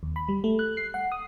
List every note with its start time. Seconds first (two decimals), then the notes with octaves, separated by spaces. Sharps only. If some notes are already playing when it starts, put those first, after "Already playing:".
0.03 D#2
0.16 B5
0.29 G3
0.44 A3
0.59 F#6
0.77 C7
0.94 F#5
1.12 D#6